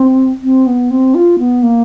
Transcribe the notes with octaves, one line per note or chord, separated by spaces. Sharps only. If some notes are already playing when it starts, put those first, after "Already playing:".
Already playing: C4
C4
B3
C4
F4
B3
A#3